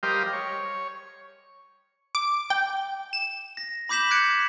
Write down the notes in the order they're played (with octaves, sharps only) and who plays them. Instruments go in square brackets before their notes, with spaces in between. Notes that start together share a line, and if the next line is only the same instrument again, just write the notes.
[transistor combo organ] G3 G4 A#4 C5 D#5 F5
C#5
[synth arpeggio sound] D6
G5
E7
[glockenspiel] A#6
B5 D6 G6 B6 E7 F#7
F#6 G#6 C#7 D7